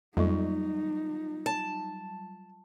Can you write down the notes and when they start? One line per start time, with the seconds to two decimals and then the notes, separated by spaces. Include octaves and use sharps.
0.17 F2 F#3 G3 D#4 F4
1.46 A5